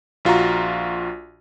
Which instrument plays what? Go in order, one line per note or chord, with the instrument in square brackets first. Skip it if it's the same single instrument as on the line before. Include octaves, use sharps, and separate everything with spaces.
[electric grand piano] A#1 F4 F#4 A#5